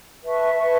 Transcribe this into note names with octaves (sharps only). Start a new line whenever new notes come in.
B4 E5 A5 C#6
B4 E5 A5 C#6